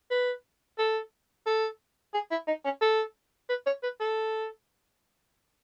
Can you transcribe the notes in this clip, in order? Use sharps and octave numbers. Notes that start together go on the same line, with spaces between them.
B4
A4
A4
G#4
E4
D#4
C#4
A4
B4
C#5
B4
A4